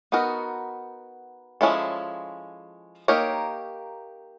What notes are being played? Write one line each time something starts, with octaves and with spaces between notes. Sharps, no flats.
B3 D#4 F#4 A#4
F3 G#3 C#4 E4 A4
A#3 D#4 G4 A#4 C#5